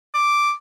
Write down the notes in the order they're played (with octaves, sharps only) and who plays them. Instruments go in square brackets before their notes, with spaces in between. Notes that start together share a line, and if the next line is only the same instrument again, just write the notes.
[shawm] D6